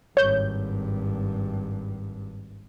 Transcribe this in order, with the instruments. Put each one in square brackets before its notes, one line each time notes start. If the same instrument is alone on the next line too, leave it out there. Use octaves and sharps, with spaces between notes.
[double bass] G#1 G2 [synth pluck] C#5 G6